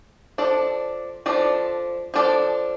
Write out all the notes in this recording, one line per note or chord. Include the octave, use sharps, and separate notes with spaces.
F3 D4 A4 D5
F3 D4 A4 D5
F3 D4 A4 D5